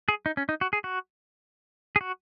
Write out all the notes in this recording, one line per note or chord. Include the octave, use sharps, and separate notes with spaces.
G#4
D#4
C#4
D#4
F#4
G#4
F#4
G#4
F#4